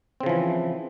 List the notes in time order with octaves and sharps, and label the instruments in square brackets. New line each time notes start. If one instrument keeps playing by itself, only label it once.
[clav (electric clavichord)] C4
C#3
F3
E3